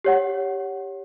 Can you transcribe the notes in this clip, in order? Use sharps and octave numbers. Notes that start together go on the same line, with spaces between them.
G4 C#5 F#5